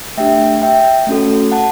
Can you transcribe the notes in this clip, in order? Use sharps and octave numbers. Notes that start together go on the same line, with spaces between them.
A3 D4 G4 E5 G5
E5 G5
A3 C#4 F#4 A4
F#5 A5